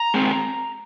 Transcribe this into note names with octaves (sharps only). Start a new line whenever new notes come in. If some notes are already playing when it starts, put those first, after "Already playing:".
Already playing: A#5
G#3 C4